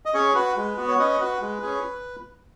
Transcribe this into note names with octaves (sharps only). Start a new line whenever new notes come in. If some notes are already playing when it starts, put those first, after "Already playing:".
D#5
C#4 G#4 C#5
F#4 B4
G#3
B3 F#4
C#5
C#4 B4 D#5
F#4 B4
G#3
C#4 G#4